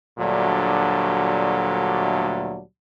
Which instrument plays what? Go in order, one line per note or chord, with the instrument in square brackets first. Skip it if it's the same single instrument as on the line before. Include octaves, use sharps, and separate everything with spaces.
[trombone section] D2 A#2 F#3 G3 A3 D4